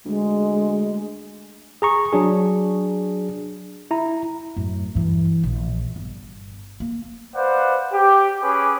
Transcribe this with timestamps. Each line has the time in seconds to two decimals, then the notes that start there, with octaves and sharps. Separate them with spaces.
0.05 D2 G#3
1.82 G#4 A#5 C#6
2.13 F#3 D4 G#4
3.91 E4 A#5
4.56 F#2 A2
4.95 G2 E3
5.44 A#1
5.96 G1
6.80 A#3
7.35 B4 C5 D5 F5 F#5
7.93 G4
8.43 C#4 G#4 B4 D6